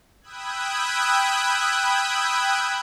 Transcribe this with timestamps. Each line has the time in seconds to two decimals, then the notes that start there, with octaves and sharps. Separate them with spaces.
0.21 G5 B5 D#6 E6 F#6 G#6